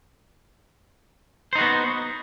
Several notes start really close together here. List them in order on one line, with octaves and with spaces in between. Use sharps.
C5 D#4 F#4 B3